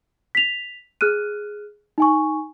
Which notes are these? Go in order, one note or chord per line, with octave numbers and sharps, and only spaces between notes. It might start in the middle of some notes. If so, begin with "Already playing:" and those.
B6 F7
G#4 F6 F#6 D#7
D#4 G#5 C#6